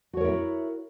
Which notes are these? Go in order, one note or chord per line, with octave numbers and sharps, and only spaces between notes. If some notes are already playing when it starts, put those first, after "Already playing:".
E4 F#4 A#4 C#5